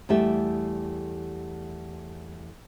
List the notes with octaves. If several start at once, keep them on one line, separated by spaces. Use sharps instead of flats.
E2 G3 A3 G4 E5